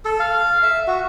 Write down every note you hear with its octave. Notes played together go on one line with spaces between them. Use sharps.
A4
F5
E5
F#4